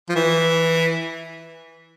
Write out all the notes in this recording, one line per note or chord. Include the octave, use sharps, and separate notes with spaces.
F3
E3